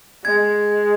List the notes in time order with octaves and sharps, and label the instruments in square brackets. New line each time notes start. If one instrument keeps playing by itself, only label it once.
[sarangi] G#3 [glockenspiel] G#6